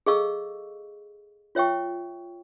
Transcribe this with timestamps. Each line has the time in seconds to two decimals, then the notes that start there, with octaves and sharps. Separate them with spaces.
0.06 G#4 A4 D#5 F5 C#6 E6
1.55 F4 C#5 E5 G5 C#6